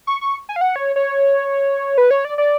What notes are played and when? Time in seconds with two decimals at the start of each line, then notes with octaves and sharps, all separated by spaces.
0.07 C#6
0.21 C#6
0.49 G#5
0.56 F5
0.61 F#5
0.76 C#5
0.96 C#5
1.98 B4
2.11 C#5
2.25 D5
2.38 D5